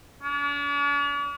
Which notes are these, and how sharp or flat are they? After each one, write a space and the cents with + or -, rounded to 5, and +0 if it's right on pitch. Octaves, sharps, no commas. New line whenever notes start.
D4 -45